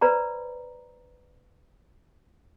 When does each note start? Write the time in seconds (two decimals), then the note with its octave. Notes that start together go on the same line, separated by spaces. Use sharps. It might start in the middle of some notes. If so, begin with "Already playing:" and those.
0.01 B4 C5 D5 A#5 B5